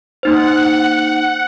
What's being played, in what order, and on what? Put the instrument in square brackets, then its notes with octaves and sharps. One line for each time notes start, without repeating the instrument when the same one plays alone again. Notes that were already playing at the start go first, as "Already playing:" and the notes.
[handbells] A#3 D#4 C5 [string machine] F#5